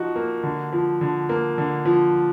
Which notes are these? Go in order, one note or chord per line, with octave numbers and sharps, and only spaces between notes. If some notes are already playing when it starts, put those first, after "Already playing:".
Already playing: F3 D#4 F#4
A#3
D3
F3
D3
A#3
D3
F3